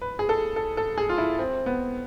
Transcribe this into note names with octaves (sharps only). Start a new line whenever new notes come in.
B4
G#4
A4
A4
A4
G#4
F4
E4
C4
B3